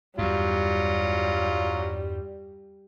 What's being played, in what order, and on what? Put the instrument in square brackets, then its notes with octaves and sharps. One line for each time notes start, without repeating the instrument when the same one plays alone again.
[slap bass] E2 G2 [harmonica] F#3 F4 [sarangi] G3